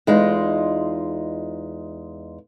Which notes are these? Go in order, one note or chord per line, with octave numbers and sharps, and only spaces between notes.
E2 G#3 D#4 F4